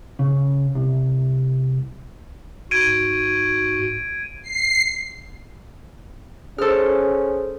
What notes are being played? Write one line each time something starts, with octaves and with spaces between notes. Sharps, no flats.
C#3
C2
G#2 F#4 G#6 D7 D#7
C7
C#4 G#4 A4 C5 F6